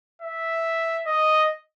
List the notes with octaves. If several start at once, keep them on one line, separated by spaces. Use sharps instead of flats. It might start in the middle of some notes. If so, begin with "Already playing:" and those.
E5
D#5